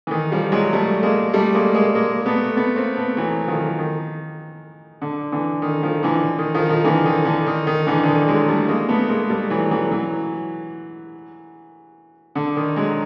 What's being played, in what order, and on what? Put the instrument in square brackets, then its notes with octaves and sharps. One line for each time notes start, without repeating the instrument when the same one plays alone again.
[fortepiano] E3
D#3
F3 G3
F#3 G#3
G3 A3
G#3 A#3
G3 A3
G#3 A#3
G#3 A#3
G#3 A#3
A3 B3
A3 B3
A#3 C4
A3 B3
E3 F#3
D#3 F3
D#3
D3
D3 E3
D#3
D#3 F3
D3 E3
D#3
D#3 F3
D#3 F3
D3 E3
D#3
D3
D#3
D#3
D3 E3
D3
D#3
F#3 G#3
G3 A3
G#3 A#3
A3 B3
G#3 A#3
G3 A3
E3 F#3
E3 F#3
E3 F#3
D3
D#3
F#3 G#3